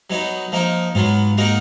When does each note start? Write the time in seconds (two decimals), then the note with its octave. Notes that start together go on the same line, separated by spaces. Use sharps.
0.10 F#3 B3 D#4
0.52 F3 A#3 D#4
0.95 G#2 F#3 B3 F4
1.38 A#3 D#4 F#4 A#4